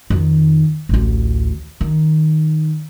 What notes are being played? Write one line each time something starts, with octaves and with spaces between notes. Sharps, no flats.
F2 D#3
A1 D2
D#3